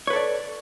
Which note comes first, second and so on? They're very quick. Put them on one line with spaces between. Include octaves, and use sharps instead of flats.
C#5 B4 A4 D5